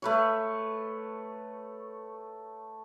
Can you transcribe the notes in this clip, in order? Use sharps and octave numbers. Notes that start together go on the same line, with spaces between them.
A3 B4 C#5